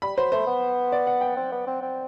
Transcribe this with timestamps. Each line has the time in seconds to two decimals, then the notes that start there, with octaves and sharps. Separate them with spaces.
0.02 G3 B5
0.17 F#3 C5
0.32 A3 C5
0.47 B3
0.92 D5
1.07 F#5
1.21 G5
1.37 C4
1.52 B3
1.67 C4
1.82 C4